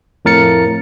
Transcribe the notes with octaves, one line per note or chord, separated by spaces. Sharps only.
F2 A2 A#4 A6 C#7